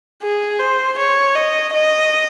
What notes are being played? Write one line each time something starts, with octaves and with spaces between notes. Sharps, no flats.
G#4
C5
C#5
D#5
D#5